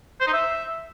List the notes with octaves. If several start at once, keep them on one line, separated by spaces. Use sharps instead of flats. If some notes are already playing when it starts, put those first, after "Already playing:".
C5
D#4
E5